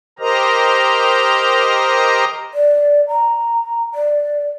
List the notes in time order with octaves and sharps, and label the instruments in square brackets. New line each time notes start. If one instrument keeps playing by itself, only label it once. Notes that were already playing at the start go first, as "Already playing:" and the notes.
[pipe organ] G4 A#4 C5 D#5 A#5
[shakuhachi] D5
A#5
D5